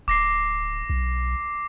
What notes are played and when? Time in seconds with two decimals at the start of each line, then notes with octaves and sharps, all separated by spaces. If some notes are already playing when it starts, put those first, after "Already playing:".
0.08 D1 D6 A#6 C7
0.90 B1